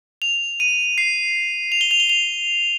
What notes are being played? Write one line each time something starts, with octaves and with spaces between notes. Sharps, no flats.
F7
D#7
C7
F7
G7
F7
G7
F7